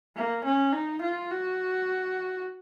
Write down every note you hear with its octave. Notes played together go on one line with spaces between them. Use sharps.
A#3
C#4
D#4
F4
F#4